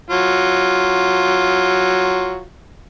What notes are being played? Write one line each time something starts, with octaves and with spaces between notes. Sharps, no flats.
F#3 F4